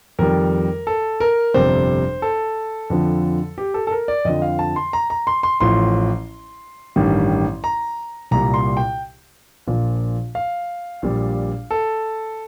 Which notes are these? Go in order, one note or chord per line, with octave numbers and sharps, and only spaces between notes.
F2 D#3 G3 A#4
A4
A#4
G1 F2 C3 G3 C5
A4
F2 D3 F3
G4
A4
A4
A#4
D5
F2 D3 F3 D#5
F5
A5
C6
A#5
A#5
C6
C6
A1 A2 F3 C6
A1 G2 D#3 G3
A#5
C2 A#2 G3 A#5
C6
G5
A#1 A#2 F3
F5
A#1 A#2 G3
A4